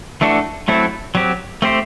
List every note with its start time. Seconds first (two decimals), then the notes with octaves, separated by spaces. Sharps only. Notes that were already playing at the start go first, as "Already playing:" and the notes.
0.21 E3 A3 D4 F#4 A4
0.68 F#3 A3 C4 E4 A4
1.15 F#3 C4 G4
1.62 A3 C4 G4 C5